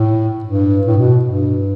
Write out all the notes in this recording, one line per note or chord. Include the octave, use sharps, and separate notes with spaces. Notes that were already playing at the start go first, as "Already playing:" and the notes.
Already playing: A2
G2
A2
B2
G2